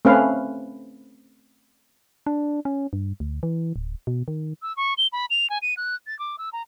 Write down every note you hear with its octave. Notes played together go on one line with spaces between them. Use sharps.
A3 C4 C#4 B4 F5
D4
C#4
G2
D2
E3
D1
B2
D#3
E6
C#6
G7
B5
F7
G#5
D#7
F#6
A6
D6
E6
A#5